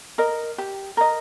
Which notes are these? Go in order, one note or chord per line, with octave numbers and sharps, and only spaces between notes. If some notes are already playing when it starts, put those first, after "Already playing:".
A#4 D#5
G4
A#4 D#5